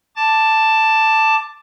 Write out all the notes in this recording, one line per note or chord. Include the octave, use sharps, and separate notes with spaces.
A5 D6 A6